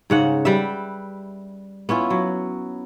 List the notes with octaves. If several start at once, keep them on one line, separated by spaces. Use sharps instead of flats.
G#2 C#3 F#5
G3 B4 E5
B3 C#4 E4 F4
F#3